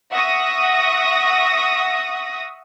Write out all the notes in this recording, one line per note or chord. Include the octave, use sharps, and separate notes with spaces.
E5 F#5 C#6 D#6 A#6